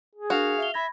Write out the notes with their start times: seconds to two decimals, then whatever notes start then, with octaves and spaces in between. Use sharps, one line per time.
0.15 G#4
0.30 D4 F#4 A#4 F5
0.58 E5 F7 G7
0.74 E5 B5 G#6 A#6